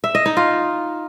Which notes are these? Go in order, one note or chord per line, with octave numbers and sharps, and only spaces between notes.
E5
D#5
D#4
F4